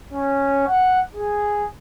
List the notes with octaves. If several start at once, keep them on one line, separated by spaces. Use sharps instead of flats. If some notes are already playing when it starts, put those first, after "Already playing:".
C#4
F#5
G#4